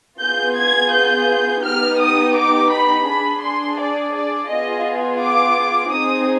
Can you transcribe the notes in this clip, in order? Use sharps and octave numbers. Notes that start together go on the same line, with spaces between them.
B3 F4 G#4 G6
G#6
G6
B3 D#4 G4 F6
D#6
D6
B5
D4 G#4 B5
C6
D5
D5
B3 F4 G#4 D#5
D6
C4 D#4 G#4 D#6